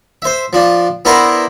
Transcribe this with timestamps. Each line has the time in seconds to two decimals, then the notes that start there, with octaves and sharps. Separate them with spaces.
0.22 C5 E5
0.53 F3 D4
1.05 B3 D4 E4 A#4 C5 A#5